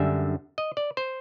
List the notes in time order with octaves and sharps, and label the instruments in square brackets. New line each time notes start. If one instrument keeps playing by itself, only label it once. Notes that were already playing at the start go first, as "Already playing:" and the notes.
Already playing: [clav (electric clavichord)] F#2 D3 G3 E5
D#5
D5
C5